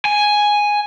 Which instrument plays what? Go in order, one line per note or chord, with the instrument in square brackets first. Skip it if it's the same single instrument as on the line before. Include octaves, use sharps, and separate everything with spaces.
[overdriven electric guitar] G#5